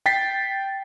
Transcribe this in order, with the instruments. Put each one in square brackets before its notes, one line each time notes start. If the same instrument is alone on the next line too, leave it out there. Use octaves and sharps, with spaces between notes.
[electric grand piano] G5 A6 B6 C7